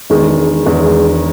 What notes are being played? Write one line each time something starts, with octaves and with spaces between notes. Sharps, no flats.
E1 E2 D#3 G#3
E1 E2 D#3 G#3